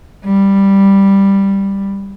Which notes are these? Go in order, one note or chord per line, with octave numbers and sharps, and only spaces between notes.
G3